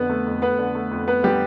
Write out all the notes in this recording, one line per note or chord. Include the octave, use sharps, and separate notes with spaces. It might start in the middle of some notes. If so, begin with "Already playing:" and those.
Already playing: F2 D3 B3 B4
A3
F2
F2 B3 B4
D3
A3
F2
A3 B3 B4
D3 G3 G4